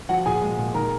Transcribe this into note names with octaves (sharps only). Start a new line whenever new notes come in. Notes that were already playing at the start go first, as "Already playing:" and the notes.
F3 F#4 F#5
A#2 G#4 G#5
G#3
A#2
D#3 A#4 A#5